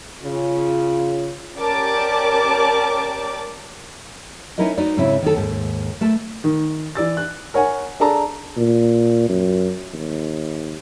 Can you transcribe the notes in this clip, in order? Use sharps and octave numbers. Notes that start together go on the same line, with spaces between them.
C#3 F4
C#4 G4 A#4 D5 A5 D6
C#4 D#4 E4 A#4 B4 D#5
D#4 F#4 B4 D5
G#2 C#3 C4 C#4 E4
D#3 A4
D#2 G#2
A3 A#4 B4 A5
D#3
E3 D5 E6 A6
F#6
A#4 C#5 F#5 G#5
D4 G#4 A4 A5 A#5
A#2
F#2
D#2